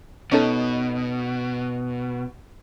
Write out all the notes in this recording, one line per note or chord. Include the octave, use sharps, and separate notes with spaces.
B2 C#4 D#4 A4